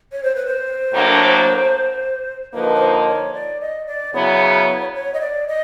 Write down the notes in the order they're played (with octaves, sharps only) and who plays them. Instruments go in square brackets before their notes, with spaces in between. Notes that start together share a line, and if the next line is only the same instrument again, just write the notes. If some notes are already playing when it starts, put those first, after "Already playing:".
[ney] C#5
C5
B4
C5
[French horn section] A2 F#3 A#3 D4
[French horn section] D3 F3 A#3 D#4 [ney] B4
[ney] C#5
C5
C#5
D5
D#5
D5
[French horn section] C#3 F#3 B3 E4 [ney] C#5
[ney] C#5
D#5
D5
D#5